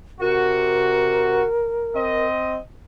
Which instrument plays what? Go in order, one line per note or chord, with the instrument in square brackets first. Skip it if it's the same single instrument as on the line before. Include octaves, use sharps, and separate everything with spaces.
[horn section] C3 F#4 [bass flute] A#4
[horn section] C4 D#5